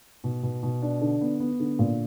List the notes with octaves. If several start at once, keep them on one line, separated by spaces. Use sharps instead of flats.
B2
B2
B2
D4
D3
B3
B3
D3
A#2